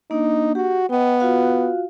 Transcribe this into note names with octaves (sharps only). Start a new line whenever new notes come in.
A#3 D4 D#4
F#4 G4
B3 D#5 G5
F4 F#4 F5